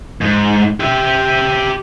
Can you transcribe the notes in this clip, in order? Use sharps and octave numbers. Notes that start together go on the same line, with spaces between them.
G#2
G4 E5